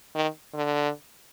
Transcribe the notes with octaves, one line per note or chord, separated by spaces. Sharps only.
D#3
D3